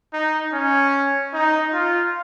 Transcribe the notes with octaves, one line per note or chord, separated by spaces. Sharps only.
D#4
C#4
D#4
F4